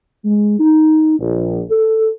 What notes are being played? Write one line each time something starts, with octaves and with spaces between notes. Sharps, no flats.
G#3
D#4
A#1
A4